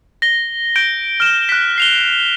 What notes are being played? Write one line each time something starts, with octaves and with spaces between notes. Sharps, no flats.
A#6 G7
G6 D7 G7
F6 E7
F#6 B6
C7 F7 G7